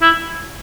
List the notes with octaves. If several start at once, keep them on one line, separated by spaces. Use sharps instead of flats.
E4